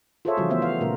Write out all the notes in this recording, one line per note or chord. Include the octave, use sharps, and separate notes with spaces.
F4 G#4 A4 C5 C#5 E5
C#3 E3 F3 G3 F4 F#4
E3 A3 B3 C5 E5
F5
A#2 C#3 A3 A#4